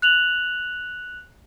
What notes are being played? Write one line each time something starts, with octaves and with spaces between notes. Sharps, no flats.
F#6 F7 F#7